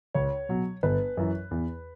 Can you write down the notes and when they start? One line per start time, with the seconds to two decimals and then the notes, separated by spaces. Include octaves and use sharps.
0.15 C#2 C#5
0.49 B2 F#3
0.83 G1 B4
1.17 F#2 E3
1.51 E2